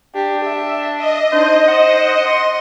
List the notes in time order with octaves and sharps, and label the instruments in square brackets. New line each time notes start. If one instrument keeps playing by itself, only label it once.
[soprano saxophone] D4 [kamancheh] G4
[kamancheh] E5
[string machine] D#5
[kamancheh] D4 D#4 [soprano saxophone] C5
[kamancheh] C5 [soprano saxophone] F#5
[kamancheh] C6